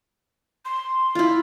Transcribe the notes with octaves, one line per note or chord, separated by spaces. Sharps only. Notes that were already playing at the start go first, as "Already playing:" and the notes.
C6
E4 F4